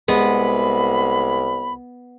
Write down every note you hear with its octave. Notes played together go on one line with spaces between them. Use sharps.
C2 G#3 B3 B5